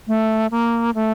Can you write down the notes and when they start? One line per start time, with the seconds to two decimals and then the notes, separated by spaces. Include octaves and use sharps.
0.07 A3
0.51 A#3
0.95 A3